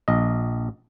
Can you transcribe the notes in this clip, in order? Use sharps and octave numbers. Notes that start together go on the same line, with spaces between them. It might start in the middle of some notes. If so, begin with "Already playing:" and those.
A#1 D#5